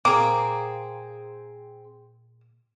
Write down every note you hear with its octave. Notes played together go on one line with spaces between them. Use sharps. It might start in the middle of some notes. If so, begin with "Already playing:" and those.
A#2 A#3 C4 G#4 D6